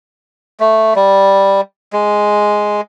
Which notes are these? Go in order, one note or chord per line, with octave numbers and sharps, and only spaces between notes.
A3
G3
G#3